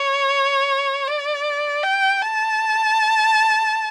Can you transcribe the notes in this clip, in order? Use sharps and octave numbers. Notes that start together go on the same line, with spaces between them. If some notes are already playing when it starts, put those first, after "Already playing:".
Already playing: C#5
D5
G5
A5